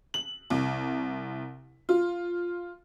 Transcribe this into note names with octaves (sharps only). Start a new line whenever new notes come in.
F#7
C2
F4